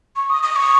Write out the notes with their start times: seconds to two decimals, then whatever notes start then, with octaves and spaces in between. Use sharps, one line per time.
0.16 C#6
0.30 D#6
0.43 D#6
0.56 C#6